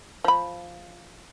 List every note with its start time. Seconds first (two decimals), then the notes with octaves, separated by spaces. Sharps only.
0.24 F3 B5